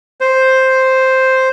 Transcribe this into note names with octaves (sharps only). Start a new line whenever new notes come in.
C5